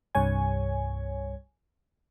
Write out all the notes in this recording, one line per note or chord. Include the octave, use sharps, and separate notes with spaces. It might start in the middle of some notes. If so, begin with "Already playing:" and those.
C2 G2 C#5 G#5